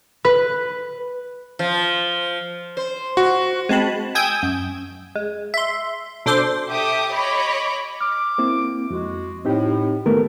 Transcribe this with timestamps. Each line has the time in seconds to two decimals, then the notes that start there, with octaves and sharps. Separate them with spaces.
0.25 B4
1.59 F3
2.77 C5
3.17 F#4
3.69 G#3 C4 A5 B5
4.15 G5 G#5 D#6 E6 G6 G#6
4.43 F#2
5.16 G#3
5.54 E5 C6
6.26 B2 D4 A4 C5 C6 D6
6.69 G4 A4 E5 D6 D#6
7.12 C#5 D#5 B5 D6
8.01 D6 F6
8.38 A#3 C4 E4
8.90 F2 G#3 F#4
9.45 A2 C4 D#4 G4
10.06 D#3 A3 B3 A#4